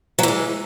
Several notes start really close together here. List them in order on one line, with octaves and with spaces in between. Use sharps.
F#3 E3 G#3